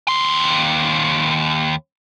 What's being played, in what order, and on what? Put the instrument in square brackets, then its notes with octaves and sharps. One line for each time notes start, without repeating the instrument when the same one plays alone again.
[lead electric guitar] D#2 C6